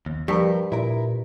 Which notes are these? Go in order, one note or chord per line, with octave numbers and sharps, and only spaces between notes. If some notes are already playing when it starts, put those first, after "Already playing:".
D#2
G2 F3 G4 A4 A#4
A#2 E4 A#4